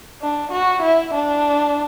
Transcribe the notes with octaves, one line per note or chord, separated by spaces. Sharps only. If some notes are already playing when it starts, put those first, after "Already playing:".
D4
F#4
E4
D4